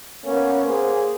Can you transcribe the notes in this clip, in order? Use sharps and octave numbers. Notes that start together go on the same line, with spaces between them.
A#3 B3 C#4
A#3 G#4 C5